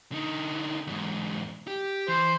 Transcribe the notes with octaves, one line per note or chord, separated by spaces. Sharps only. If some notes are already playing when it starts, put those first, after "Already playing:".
D3 D#4
E2 G#2
G4
E3 C5